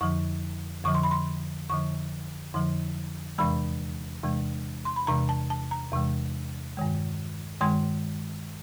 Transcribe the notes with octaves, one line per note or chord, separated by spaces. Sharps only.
F2 D3 F3 C#6
F2 D3 F3 C#6
C6
B5
C6
F2 D3 F3 C#6
F2 D3 F3 C6
E2 C3 E3 G#3 B5
E2 C3 E3 G#3
C6
B5
E2 C3 E3 G#3 A#5
A5
A5
A#5
E2 C3 E3 G#3
G2 D#3 G#3
G2 D#3 G#3 C6